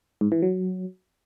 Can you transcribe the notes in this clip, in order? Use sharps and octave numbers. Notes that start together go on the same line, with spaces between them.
G#2
E3
F#3